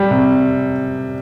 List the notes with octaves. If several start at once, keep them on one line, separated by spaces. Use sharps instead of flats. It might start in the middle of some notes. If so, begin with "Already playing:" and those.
Already playing: G3
C3